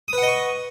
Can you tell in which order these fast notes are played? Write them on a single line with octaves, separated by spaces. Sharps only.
D#6 B4 F#5 D#5 C#6